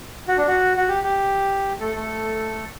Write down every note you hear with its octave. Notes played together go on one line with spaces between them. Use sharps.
F#4
D4
F#4
F#4
G4
G4
A3 A4
A3 A4